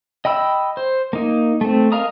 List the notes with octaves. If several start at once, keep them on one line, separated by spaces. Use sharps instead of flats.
D#5 G5 B5 E6
C5
A#3 D#4
A3 C4
A#4 D#5 F5 A#5 D#6